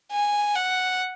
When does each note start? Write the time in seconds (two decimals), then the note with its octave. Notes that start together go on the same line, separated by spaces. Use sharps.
0.12 G#5
0.55 F#5